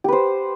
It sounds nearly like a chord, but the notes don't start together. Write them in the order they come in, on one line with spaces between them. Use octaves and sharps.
G4 B4 C5